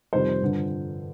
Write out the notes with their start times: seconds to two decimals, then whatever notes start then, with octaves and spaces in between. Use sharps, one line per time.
0.13 F2 C3 D#3 G3 C5
0.41 G2 D3 F3